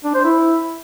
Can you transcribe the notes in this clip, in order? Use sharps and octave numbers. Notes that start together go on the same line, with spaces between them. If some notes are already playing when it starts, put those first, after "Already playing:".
D4
C5
E4